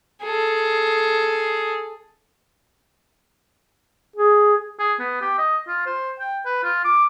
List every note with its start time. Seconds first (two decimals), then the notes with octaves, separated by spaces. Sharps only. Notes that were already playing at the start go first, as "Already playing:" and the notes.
0.22 G#4 A4
4.16 G#4
4.79 G#4
4.99 B3
5.21 G4
5.38 D#5
5.68 F4
5.86 C5
6.19 G5
6.45 B4
6.63 F4
6.84 D6